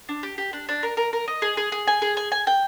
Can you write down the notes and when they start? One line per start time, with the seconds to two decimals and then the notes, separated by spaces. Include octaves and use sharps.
0.09 D4
0.23 G4
0.38 G4
0.53 D4
0.69 D4
0.83 A#4
0.97 A#4
1.13 A#4
1.28 D#5
1.42 G#4
1.57 G#4
1.72 G#4
1.88 G#5
2.02 G#4
2.17 G#5
2.32 G#5
2.47 G5